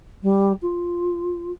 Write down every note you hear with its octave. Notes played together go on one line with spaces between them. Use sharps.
G3
F4